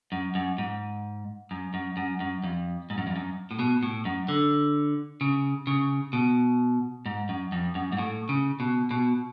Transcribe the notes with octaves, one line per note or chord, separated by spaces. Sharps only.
F#2
F#2
G#2
F#2
F#2
F#2
F#2
F2
G#2
F#2
F2
F#2
A2
B2
A2
F#2
D3
C#3
C#3
B2
G#2
F#2
F2
F#2
G#2
A2
C#3
B2
B2